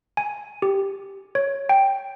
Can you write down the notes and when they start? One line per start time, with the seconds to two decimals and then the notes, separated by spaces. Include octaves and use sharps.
0.17 G#5
0.62 G4
1.35 C#5
1.69 G5